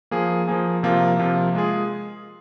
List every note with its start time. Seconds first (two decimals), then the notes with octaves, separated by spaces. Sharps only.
0.11 F3 A#3 G#4
0.48 F3 A#3 G#4
0.83 C3 F3 A#3 F4
1.19 C3 F3 A#3 F4
1.55 G#3 F4 G#4